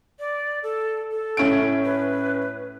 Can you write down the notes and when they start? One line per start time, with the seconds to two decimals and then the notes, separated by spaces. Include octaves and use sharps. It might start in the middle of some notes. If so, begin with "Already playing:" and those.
0.19 D5
0.63 A4
1.11 A4
1.37 A2 C#4 D7
1.85 B4